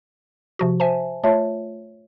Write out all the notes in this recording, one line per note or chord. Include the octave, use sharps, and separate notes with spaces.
C3 F3 F#4
C5 E5 G#5 A5
A3 F4 C#5 E5 A5